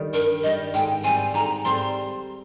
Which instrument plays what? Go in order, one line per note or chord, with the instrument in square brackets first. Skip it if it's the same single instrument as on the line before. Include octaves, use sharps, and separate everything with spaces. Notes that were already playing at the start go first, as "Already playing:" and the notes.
Already playing: [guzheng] D#3 G3
[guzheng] G2 [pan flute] A#4
[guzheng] D#3 G3 [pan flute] D#5
[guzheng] G#2 [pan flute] G5
[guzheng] G3 C4 [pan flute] G#5
[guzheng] G#2 [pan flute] A#5
[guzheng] G3 C4 [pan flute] C6